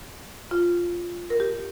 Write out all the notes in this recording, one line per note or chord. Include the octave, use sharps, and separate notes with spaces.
F4
A#4
G4